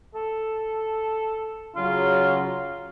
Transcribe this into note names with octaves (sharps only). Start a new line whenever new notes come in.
A4
C#3 F#3 F4